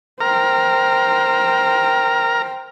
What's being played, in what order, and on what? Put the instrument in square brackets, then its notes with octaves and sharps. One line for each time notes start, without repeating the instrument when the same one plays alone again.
[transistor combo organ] A#4 A#5 [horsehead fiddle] C5 G5